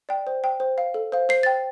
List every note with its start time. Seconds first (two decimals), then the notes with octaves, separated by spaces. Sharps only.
0.09 D5 G5
0.27 C5
0.44 G5
0.60 C5
0.78 F5
0.94 A4
1.12 C5 F5
1.29 C5 C7
1.43 G5 A6